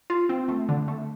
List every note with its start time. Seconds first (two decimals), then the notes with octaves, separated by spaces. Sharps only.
0.10 F4
0.29 C4
0.48 A3
0.69 D3
0.88 A3